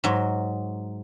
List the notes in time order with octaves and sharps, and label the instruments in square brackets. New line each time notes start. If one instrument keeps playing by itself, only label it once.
[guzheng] G#2 F#3